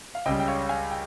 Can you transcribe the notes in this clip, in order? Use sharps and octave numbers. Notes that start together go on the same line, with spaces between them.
F5
C#2 C#3 G3 D#5 G5
G5
C#5 F5
F5 G#5
G5